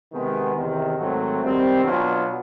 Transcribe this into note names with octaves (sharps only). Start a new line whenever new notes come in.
C3 D#3 G#3 B3
E2 C3 D#3
G#2 D#3 F#3 A3 C4
D#3 G3 C4
B2 F#3 B3 D4 F4